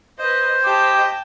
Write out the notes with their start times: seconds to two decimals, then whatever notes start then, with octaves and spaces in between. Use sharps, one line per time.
0.19 B4 C5 D#5
0.64 G4 D#5 G5 A5 D6